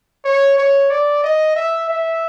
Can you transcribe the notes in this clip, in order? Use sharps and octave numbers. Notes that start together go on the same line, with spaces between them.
C#5
C#5
D5
D#5
E5
E5